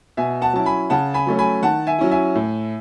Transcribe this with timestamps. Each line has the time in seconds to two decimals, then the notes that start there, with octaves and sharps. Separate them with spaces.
0.17 B2 E5 G#5
0.42 F#5 A5
0.53 F#3 C#4 E4 A5
0.66 G#5 B5
0.90 C#3 F#5 A5
1.14 G#5 B5
1.26 F#3 A3 C#4
1.39 G#5 B5
1.63 D#3 F#5 A5
1.87 E5 G#5
1.99 F#3 C#4 E4
2.11 E5 G#5
2.35 A2